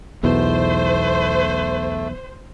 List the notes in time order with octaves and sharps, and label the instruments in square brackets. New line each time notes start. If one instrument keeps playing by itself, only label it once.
[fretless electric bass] B1 E2 B2 [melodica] A3 [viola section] C5